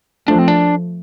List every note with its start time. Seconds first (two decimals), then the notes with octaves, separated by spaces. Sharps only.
0.28 F3 A3 D4
0.39 C4
0.48 D4